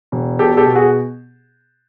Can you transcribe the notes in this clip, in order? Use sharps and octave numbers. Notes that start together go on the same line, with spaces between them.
E1
B2 G4 A4
G4 A4
B2
F#4 G#4